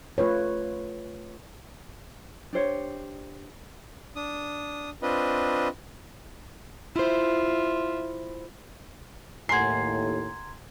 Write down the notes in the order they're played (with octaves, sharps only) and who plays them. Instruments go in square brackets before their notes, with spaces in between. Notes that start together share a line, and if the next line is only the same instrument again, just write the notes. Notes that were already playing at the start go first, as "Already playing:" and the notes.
[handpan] A3 F4 B4 C#5
[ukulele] D4 G4 C5 C#5
[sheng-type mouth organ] D4 D#6
C4 D4 F4 B4 D#5
[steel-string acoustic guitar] E4 C5 [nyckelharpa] F4 E5
[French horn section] D#2 A2 [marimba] F#5 G#5 [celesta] A#5 C6 G#6 [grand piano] C7